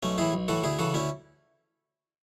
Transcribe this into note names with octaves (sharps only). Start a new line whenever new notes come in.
B1 A3 C#4
A2 E3 E4 G#4
B1
A2 E3 F#4 A4
D2 E4 G#4
C#3 E3 F#4 A4
D2 C#4 E4